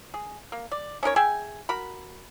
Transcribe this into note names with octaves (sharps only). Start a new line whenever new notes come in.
G#4
A#3
D5
C#4 D#4 A#4 C#5
G#4 E5 G5 G#5
F#4 A#4 B5